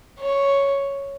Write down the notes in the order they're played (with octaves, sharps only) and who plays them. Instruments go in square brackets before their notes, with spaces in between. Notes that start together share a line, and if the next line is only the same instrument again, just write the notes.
[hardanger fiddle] C#5